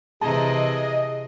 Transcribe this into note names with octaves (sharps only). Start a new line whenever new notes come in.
C3 E3 G#4 D#5 A5 A#5